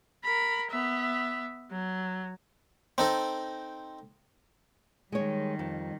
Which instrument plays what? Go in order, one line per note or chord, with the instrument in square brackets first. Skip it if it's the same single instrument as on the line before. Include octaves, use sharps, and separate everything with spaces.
[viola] A#4 B5
B3 E5
F#3
[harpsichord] C4 D#4 A4
[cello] D#3 G3 [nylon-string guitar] G#3 C#5
[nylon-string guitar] F2